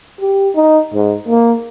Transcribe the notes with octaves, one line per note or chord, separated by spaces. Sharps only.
G4
D#4
G#2
A#3